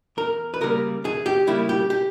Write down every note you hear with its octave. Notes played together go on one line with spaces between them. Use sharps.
E2 A#4
B4
C#3 G3 A#3 A#4
E2 G#4
G4
C#3 G3 A#3 E4
G4
G4